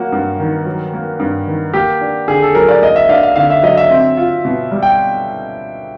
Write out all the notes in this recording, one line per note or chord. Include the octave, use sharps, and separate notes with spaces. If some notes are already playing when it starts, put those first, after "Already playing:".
Already playing: F#3 A#3 F#4
G2
D#3
F#3
A#3
G2
D#3
A#3 G4
D4
D3 G#4
A4
F#3 A#4
D5
A#3 D#5
E5
D4 F5
F5
D3 F5
E5
F#3 D#5
E5
C4
F4
B2
G3
G5